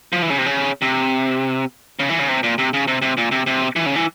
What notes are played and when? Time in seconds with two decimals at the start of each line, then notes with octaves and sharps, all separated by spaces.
0.13 F3
0.22 E3
0.30 C#3
0.38 C3
0.46 C#3
0.82 C3
1.99 C#3
2.10 E3
2.19 C#3
2.29 C3
2.43 A#2
2.58 C3
2.73 C#3
2.88 C3
3.02 C3
3.17 A#2
3.32 C3
3.47 C3
3.76 E3
3.86 C#3
3.96 E3